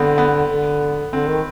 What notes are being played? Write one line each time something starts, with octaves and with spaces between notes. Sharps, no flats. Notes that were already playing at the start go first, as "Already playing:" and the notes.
Already playing: D3 B3 C4
B3
D3
D3 C4
D#3